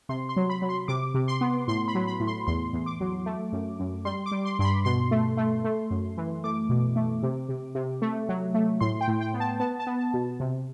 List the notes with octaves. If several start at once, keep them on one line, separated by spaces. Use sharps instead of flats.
C3 C6
C6
F#3
B5
F#3
C6
C3 D6
C3
C6
B3
A2 C6
B5
F#3
B5
A2
C6
E2 C6
E2
D6
F#3
A3
F#2
F#2
G3 C6
D6
G3
C6
G2 C6
B5
B2 C6
A3
A3
A3
F#2
E3
A3 D6
B2
A3
C3
C3
C3
A3
F#3
A3
A2 C6
G5
A2
G5
B3
A5
B3 A5
A5
B3
A5
B2
C3